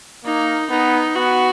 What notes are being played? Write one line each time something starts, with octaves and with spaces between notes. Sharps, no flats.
A#3 D#4
B3 D#4
B3 F#4